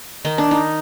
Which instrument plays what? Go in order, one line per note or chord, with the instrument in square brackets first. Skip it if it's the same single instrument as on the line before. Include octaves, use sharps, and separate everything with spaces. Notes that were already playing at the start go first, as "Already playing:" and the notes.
[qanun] D#3 D#4
D4
D#4